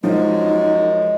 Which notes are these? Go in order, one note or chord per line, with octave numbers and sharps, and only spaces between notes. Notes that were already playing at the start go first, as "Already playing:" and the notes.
F#2 F3 G#3 D#4